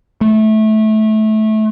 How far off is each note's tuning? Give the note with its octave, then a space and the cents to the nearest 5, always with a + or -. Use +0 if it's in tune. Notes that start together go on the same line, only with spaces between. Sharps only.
A3 -20